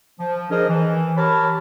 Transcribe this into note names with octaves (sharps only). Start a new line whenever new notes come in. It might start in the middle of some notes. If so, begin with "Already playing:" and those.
F3
D4 G#4 A#4 C5 D#5
E3
G4 A#4 C#5 A5 B5